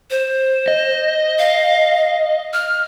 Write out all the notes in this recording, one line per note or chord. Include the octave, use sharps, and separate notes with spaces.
C5
D#5
F5
F6